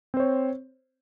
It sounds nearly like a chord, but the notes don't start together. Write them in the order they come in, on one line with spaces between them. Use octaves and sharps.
C4 C5 C#5